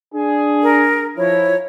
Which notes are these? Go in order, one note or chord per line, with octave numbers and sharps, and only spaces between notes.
D4 G#4
A#4
F3 E4 C#5